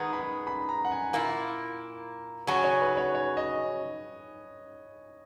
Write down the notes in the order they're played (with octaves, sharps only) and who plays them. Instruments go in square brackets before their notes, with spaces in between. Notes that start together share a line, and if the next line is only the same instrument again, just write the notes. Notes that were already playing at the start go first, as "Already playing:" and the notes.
Already playing: [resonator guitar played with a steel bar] D#3 G#3 B3 D#4 [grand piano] A#5
[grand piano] B5
B5
A#5
F#5
G#5
[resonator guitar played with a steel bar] A#2 A#3 E4
[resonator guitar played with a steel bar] C#3 F#3 C#4 [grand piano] G#5
[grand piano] C#5
B4
C#5
C#5
D#5